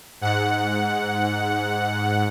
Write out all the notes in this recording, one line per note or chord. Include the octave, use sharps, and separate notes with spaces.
G#2 F#5